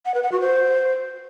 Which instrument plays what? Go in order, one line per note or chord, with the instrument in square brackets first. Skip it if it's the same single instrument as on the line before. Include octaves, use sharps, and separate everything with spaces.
[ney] F#5
B4
F#5
F#4
C5